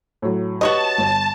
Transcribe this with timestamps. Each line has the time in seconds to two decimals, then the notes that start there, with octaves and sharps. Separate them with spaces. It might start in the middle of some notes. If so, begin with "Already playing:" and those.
0.22 A2 F#3
0.61 F#4 G4 B4 C#5 D#5 A5
0.98 G1